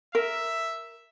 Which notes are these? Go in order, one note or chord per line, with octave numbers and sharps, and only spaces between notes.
A#4 E5